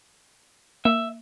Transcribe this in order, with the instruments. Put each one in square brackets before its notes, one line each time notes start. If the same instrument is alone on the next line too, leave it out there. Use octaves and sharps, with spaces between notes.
[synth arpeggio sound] A#3 [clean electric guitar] E5